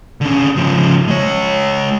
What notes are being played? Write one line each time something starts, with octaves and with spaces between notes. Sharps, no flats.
D3 C#4
C#3 F3
G#3 C#5